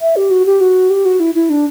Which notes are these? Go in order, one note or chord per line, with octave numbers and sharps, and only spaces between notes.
E5
G4
F#4
G4
F#4
G4
F#4
E4
E4
D4